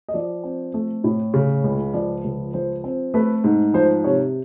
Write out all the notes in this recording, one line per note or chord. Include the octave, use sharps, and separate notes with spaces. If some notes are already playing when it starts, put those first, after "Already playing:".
D#5
F3 D5
C4
A3
A2
C#3
C#2
F3 D5
C#2
F3 C5
C4
A3 B4
G#2
F3 C5
C3 C#5